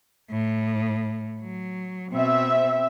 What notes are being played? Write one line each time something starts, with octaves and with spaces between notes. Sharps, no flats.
A2
F#3
B2 C4 E5